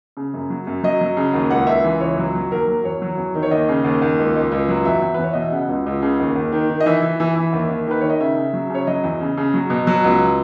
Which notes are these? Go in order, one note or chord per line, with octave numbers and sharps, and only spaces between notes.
C#3
F#2
F#3
F#2
F#3 D#5
F#3
C#3
D#2
C#2 F#5
C#2 E5
E3
C#2 C#5
F#3
F#3
D#2 A#4
F#3
E2 C#5
F#3
E2
D#3
C#5
D#2 D#5
C#3
D#2
D#2
C#2
C#2
C#2
F#3
E2 E5
E2
E2 B4
C#5
B2 D#5
E5
C#3 F#5
C#2
C#2
C#3
D#2
D#2
D#3
D#3
D#5
E3 E5
E3
E3
E3
D#2
D#2
D#3 B4
D#3 C#5
D#5
C#3 E5
C#3
F#3
C#3 C#5
F#3 D#5
E2
C#3
C#3
F#3
B2
F#3
C#2